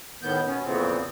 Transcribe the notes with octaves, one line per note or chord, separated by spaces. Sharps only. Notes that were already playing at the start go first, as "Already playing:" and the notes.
A2 D#3 B3 G6
B2 B3 C#4
F2 A#2 C#3 E3 B3 C4